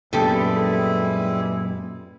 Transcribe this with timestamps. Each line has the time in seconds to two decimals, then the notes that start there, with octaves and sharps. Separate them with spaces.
0.13 F#2 A#2 G3 G#3 B3 E4 G4 A4